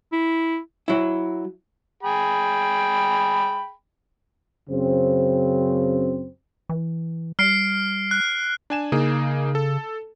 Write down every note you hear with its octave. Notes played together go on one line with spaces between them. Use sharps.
E4
F#3 E4
G#4 G5 B5
F#2 C#3 C4
E3
G3 F6 C7 D7
F#6
D4 G#5 E7
C#3 A#3 D#4 G#4
A4